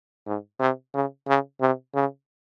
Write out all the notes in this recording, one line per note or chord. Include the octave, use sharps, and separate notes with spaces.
G#2
C3
C#3
C#3
C3
C#3